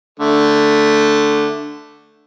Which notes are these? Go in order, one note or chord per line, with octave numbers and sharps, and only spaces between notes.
D3 A3